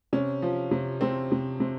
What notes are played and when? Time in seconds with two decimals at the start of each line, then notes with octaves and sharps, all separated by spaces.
0.13 C3 C#4
0.42 F3
0.71 C3
1.01 C3 C4
1.32 C3
1.60 C3